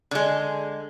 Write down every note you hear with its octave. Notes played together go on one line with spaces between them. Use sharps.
D3 G#3